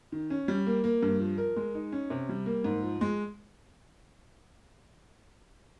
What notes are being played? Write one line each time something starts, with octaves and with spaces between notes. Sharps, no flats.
D#3
C#4
G3
A#3
A#3
G2
F3
A#4
G#3
D#4
C#4
C3
G3
A#3
G#2
F3
G#3